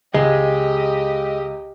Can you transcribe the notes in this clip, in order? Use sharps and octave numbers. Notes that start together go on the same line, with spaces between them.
C#2 G#3 G4 D#5